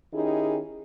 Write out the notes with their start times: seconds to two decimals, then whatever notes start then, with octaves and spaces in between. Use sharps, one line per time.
0.13 D#3 C#4 D#4 E4 G4 G#4